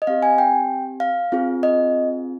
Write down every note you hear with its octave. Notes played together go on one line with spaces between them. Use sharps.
D#5
C4 G4 F5
G#5
G5
F5
C4 F4 G#4
D#5